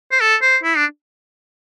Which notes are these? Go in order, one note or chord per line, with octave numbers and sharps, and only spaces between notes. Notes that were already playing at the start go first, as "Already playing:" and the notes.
C5
A4
C5
E4
D4